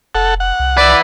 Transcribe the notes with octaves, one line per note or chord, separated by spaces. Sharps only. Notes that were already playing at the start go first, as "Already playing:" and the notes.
F1 A4 F#5
F#5
C2
B4 D5 E5